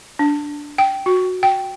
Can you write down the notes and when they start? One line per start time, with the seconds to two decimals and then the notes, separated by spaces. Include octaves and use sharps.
0.19 D4
0.78 G5
1.06 F#4
1.43 G5